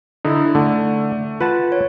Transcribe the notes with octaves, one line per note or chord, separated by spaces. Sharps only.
D3 D#4 E4 A4
D3 A3
F4 B4 F#5 A5
C#5